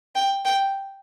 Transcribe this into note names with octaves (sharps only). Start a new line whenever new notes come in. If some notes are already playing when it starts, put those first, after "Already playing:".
G5
G5